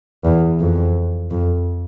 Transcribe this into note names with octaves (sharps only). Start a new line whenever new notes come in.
E2
F2
F2